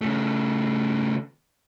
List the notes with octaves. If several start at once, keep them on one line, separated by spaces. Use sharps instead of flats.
C#3 A3